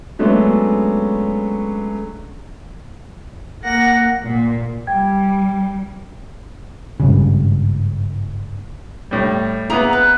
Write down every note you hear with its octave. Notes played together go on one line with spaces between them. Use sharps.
F#3 G#3 A3 B3 C#4 D4
A#3 F#5 A#6
A#2
G3 G5 G#6
G#1 G2 C#3
A2 G3
A#3 B3 E4 G#4 A#5
B4